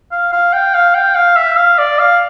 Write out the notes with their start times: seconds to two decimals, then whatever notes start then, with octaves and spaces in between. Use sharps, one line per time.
0.12 F5
0.32 F5
0.53 G5
0.74 F5
0.94 G5
1.15 F5
1.36 E5
1.57 F5
1.78 D5
1.99 F5